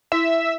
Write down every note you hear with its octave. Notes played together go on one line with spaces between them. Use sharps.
E4 E5